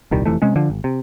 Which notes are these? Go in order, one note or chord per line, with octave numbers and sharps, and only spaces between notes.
D#1 C2 D#3 G3
F1 C3 E3 A3
C3 G#3 C#4
D3 F3
G#1
C3